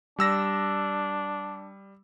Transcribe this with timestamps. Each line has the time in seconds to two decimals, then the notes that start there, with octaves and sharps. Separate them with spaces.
0.19 G3 D4 E6 A#6